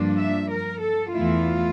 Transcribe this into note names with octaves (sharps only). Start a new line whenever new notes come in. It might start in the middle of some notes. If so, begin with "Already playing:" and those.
Already playing: G2 F3 A#3 D4
E5
A#4
A4
E2 E3 A3 E4 F4